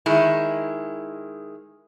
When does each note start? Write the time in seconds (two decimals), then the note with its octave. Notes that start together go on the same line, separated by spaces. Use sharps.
0.06 D#3 G#3 E4